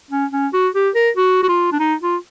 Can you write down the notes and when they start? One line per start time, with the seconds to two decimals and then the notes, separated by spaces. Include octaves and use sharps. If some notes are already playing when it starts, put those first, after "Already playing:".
0.11 C#4
0.33 C#4
0.53 F#4
0.75 G4
0.95 A#4
1.17 F#4
1.43 F#4
1.49 F4
1.72 D4
1.80 D#4
2.02 F4